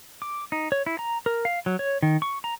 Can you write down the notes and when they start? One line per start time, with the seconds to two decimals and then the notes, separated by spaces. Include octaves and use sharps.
0.22 D6
0.52 D#4
0.72 C#5
0.86 E4
0.99 A#5
1.26 A#4
1.45 F5
1.66 F#3
1.79 C#5
2.02 D#3
2.22 C#6
2.44 A#5